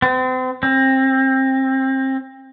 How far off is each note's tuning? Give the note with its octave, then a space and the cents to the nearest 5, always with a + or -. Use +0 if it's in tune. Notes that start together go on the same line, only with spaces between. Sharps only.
C4 -35
C4 +25